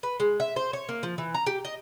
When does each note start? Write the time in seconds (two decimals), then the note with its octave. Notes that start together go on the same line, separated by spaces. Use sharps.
0.03 B4
0.20 G#3
0.40 E5
0.56 C5
0.73 C#5
0.89 A#3
1.03 F3
1.18 E3
1.35 A#5
1.47 G4
1.65 D#5